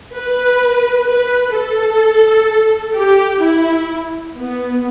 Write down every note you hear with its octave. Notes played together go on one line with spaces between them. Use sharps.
B4
B4
A4
G4
E4
B3